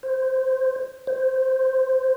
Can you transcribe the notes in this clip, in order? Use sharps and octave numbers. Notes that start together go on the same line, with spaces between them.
C5
C5